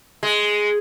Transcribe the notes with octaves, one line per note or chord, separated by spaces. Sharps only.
G#3